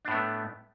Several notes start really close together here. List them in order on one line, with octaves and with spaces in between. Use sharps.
D4 A2 B3 A3